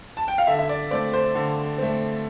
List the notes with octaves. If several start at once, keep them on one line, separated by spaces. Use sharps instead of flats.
A5
G5
F5
D3 E5
E5
D5
A3 C4 D5
C5
D3
A3 C4